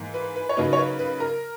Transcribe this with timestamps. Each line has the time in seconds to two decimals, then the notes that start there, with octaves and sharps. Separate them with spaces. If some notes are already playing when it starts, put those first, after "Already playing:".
Already playing: G#2 E3 A#3
0.14 B4
0.36 B4
0.49 C#5
0.57 C#3 F#3 A#3 D#4 B4
0.73 C#5
0.77 B4
0.99 B4
1.20 A#4